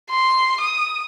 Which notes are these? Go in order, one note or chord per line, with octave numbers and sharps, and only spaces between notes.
C6
D#6